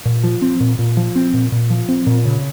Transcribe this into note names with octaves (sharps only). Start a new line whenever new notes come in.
A#2
F3
C4
A#2
A#2
F3
C4
A#2
A#2
F3
C4
A#2
C#3